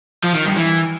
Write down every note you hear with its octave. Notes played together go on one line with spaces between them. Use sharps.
F3
D#3
G2
E3